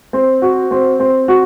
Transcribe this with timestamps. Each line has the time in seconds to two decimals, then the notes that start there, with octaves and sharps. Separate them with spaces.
0.13 C4
0.42 F#4
0.71 C4
1.00 C4
1.28 F#4